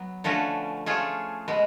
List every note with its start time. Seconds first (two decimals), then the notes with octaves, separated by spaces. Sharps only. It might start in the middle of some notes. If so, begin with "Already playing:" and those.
Already playing: F#3 B3
0.24 D3 F3 A3 C#4 F#4
0.86 A3 C#4 F4 G#4
1.48 B2 G#3 B3